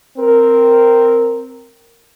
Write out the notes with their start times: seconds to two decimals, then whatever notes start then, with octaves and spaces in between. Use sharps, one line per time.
0.19 C4 A#4